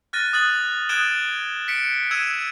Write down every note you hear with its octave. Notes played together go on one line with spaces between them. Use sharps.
F6 F#6 A6 A#6 D#7
D#6 F#6 A6 F#7
D#6 F#6 G#6 D7 E7 G7
B6 C#7 D7
E6 G#6 D#7 E7